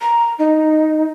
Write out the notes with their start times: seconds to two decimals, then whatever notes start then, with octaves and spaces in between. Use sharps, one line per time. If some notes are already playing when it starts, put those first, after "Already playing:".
0.01 A#5
0.39 D#4